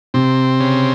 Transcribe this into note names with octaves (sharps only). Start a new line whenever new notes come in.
C3 C4
C#3